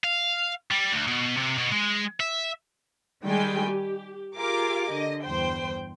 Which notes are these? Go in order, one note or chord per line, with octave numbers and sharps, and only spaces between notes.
F5
G3
D2
B2
C3
B2
G#3
E5
D#3 G3 G#3 G5 G#5
G4
F4 G4 G#4 A#4 F5 D6
D3 D#5
E2 G2 C5 G5